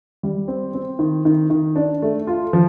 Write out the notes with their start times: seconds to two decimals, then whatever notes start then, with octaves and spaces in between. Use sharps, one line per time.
0.23 G3
0.48 C4
0.74 C4
0.99 D#3
1.25 D#3
1.50 D#3
1.76 D4
2.02 A3
2.27 F4
2.53 F3